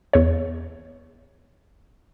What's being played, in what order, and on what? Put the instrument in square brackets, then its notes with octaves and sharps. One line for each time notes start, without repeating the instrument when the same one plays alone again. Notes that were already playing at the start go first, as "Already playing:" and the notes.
[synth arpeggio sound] E2 C#5